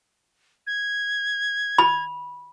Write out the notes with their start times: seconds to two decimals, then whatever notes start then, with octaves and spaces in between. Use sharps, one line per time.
0.67 G#6
1.78 B5